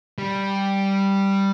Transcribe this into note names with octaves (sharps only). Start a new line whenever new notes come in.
G3